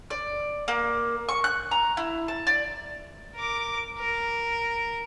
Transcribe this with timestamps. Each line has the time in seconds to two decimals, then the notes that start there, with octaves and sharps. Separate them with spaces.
0.10 D5
0.68 A#3
1.29 C#6
1.44 F#6
1.71 A#5
1.97 E4
2.28 A5
2.47 D5
3.35 A#4 D6
3.98 A#4